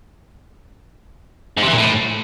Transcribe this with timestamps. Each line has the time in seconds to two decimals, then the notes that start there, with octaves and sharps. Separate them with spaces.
1.57 G#2
1.62 C3
1.68 E3
1.73 A#2
1.78 A2